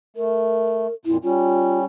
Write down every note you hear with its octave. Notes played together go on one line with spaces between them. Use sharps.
A3 A#4
F2 A#2 E4
G3 C#4 F4